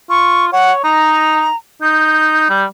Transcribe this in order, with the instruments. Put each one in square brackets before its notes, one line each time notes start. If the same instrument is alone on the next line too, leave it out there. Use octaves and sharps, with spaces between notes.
[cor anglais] F4 [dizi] C#6
[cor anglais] C#5 [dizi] F#5
[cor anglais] D#4 [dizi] A#5
[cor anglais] D#4 [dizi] G6
[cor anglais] G3